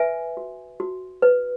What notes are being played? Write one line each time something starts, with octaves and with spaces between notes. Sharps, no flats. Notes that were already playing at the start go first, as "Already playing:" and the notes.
Already playing: B4 E5 G#5
F#4
F#4
B4